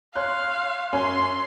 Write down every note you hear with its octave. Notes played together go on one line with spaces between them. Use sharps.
C#5 F5 C6 F#6
F#2 C#5 G#5 C6